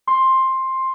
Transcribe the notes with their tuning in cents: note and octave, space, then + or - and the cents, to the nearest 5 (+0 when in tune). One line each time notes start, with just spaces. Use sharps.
C6 +10